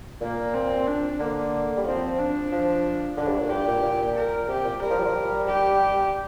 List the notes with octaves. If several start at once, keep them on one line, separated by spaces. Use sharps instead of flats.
A#2 A#3
C4
D4
D3 A#3
G3
F3 C4
D4
F3
D3 D4
G2
A#2
G2 G4
A#2
A#2
A#4
C3 G4
A#2
G3 A#4
F3
G3
F3
G3
G4